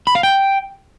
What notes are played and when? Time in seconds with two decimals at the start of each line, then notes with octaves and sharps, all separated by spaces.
0.07 B5
0.15 F5
0.23 G5